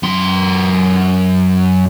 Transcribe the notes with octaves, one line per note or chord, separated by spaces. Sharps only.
F#2 C6